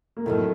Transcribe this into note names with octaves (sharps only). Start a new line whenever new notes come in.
A#3
F2 A2 D#3 F#3 A3